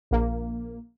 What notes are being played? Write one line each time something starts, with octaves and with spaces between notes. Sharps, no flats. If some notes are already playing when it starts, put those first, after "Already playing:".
A#1 A#3